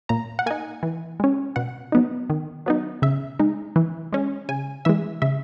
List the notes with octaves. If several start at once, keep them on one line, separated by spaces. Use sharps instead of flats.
A#2 A#5
F#5
A#3 D#4 G#5
E3
G#3 C#4
B2 F#5
F#3 B3 D#4
D#3
F#3 B3 D#4
C#3 E5
G#3 D#4
E3
G#3 C#4
C#3 G#5
E3 G#3 E5
C#3 E5